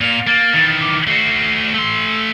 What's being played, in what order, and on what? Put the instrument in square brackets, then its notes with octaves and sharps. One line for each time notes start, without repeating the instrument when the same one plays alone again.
[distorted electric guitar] A#2 [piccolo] F7
[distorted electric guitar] A#3 [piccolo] A6
[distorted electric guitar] D#3 E3
[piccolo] D6
[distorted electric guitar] A3 F#4 [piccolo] C7
[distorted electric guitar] A3 C6 [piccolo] E6